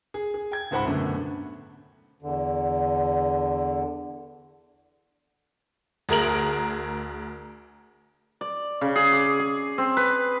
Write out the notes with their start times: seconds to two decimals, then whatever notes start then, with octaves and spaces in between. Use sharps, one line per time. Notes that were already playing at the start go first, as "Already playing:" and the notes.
0.14 G#4
0.34 G#4
0.52 G5 G#6
0.71 C#2 G#2 C5 F#5 B5
0.85 F#2 B2 D3 A3
2.22 E2 D3
6.09 D2 G#4 A#4 F#7
8.41 D5
8.81 C#3
8.95 G#4
9.12 D6
9.39 G#4
9.78 C4
9.97 B4